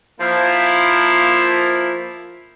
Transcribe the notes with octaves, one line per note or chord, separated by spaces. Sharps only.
F3 A#3 E4